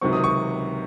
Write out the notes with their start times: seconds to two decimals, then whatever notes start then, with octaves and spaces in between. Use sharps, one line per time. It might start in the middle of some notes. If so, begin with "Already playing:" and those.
0.01 C#2 C3 D#3 F#3 C4 C#6
0.13 D#6
0.24 C#6